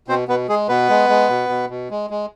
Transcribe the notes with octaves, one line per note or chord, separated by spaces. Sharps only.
B2 C4 C5
B2 B3 B4
G#3 G#4
B2 B3 B4
G#3
G#3
B2
B2
B2
G#3
G#3